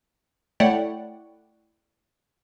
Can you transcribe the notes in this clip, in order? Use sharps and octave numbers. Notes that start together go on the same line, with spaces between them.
A3 E4 C#5 D5 F#5 G5